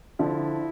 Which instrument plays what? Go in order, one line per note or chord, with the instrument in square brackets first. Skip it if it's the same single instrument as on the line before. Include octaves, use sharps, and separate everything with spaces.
[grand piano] D3 F3 [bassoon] E4